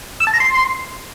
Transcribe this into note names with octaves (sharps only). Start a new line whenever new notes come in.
E6
A5
A#5
C6